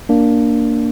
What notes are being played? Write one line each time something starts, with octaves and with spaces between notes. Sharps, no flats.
A#3 D4